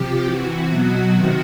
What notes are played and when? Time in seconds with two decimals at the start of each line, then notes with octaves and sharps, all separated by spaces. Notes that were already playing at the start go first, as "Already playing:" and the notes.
Already playing: C3 F3 G4
0.24 C3 E3 F#4
0.68 B2 F#3
1.13 C3 D#3